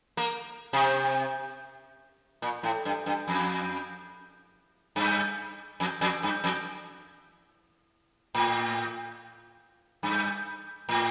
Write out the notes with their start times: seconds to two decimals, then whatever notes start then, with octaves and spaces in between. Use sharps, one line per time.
0.17 A#3
0.73 C3
2.42 A#2
2.63 A2
2.85 G2
3.06 G2
3.28 F2
4.96 G2
5.80 F2
6.01 F2
6.23 G2
6.44 F2
8.35 A2
10.03 G2
10.89 A2